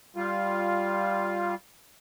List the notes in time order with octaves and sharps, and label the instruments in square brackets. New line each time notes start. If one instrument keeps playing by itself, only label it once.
[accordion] G3 F4